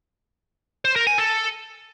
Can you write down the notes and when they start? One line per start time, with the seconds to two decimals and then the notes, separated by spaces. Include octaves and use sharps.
0.85 C5
0.96 A#4
1.07 G#5
1.18 A4